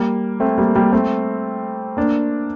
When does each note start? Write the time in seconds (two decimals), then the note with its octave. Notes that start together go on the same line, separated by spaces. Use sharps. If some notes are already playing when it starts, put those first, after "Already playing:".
Already playing: G3 A#3
0.40 A3 C4
0.58 G3 A#3
0.75 G3 A#3
0.93 A3 C4
1.97 A#3 D4